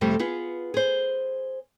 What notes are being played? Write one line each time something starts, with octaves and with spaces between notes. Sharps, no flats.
F2 C3 G3 A3
B3 F4 G#4
G#4 C5